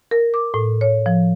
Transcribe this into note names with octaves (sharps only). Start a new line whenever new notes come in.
A#4
D6
A2
C#5
F3